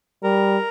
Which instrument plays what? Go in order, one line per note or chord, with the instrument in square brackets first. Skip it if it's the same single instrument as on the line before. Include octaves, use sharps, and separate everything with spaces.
[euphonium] G3 [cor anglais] A#4